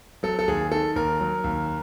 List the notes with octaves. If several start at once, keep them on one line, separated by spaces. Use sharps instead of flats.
F#3 A4
A4
D#2 G#4
D#3 A4
D#2 A#4
F#3
D#2